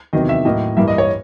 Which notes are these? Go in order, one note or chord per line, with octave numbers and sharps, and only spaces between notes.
E2 C3 D#3 F#3 D#5
E5
A2 F#3 A#3 D#5
G2 E3 G3 A#3 E5
D#5
C#5